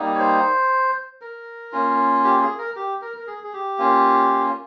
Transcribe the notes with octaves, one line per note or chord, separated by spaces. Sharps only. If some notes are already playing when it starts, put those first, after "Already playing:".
Already playing: G3 A#3 D#4
C#5
C5
A#4
A#3 C#4 F4
G4
G#4
A#4
G4
A#4
A#4
G#4
G#4
G4
A#3 C#4 F4